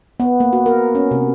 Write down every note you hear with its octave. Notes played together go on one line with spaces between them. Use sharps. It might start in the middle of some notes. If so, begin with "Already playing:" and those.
B3
A#3
F#4
A#4
C#4
C3